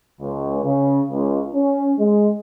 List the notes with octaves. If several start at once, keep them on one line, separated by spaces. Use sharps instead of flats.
C#2
C#3
C#2
C#4
G#3